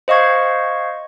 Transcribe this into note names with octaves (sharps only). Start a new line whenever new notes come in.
C5 D#5 F5 C#6 G#6